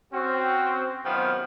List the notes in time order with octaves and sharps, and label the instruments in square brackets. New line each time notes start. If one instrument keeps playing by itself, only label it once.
[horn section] C4 C#4 F#4
F#2 C3 D#3 F3 B3 G5